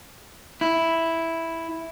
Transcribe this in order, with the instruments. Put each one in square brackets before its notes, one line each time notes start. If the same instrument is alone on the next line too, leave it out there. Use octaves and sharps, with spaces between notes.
[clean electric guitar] E4